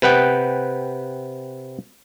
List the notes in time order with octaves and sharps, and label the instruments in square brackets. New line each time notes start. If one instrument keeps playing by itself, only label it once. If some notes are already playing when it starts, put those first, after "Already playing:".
[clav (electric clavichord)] C3 B4 F#5 G5